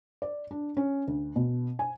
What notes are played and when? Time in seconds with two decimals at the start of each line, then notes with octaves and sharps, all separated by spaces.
0.22 D5
0.51 D4
0.77 C#4
1.08 D2
1.36 B2
1.79 G#5